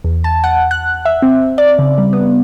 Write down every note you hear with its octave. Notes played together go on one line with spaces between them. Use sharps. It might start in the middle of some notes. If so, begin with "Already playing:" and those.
E2
A5
F#5
F#6
E5
C4
D5
C#3
G3
B3